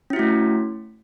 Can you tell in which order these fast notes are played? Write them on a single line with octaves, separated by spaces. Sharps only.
C#4 E4 F#4 A3